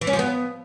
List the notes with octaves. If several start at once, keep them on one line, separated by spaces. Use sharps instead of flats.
E3
C#4
F3
B3